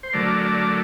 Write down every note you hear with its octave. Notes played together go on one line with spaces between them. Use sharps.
C5
D3 F#3 A3 A#4 D5
A#4 D5